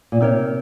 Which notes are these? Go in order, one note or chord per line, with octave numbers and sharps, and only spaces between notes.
A#2
C3 C4 D#4 A#4 C#5